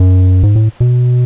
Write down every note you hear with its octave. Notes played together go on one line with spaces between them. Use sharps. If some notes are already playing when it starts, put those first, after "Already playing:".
Already playing: F#2
G#2
A2
B2